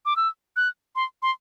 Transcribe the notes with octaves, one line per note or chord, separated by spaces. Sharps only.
D6
E6
F#6
C6
C6